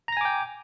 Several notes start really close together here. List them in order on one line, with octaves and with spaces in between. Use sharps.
A#5 A#6 G#5 D6 G5